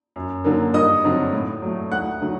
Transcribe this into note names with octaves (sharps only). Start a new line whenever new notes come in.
F#2
D3 F#3 A#3
G2 D#5 D#6
D3 F#3 C4 D#4
A2
F#3 A3
D2 F#5 F#6
D3 F#3 A3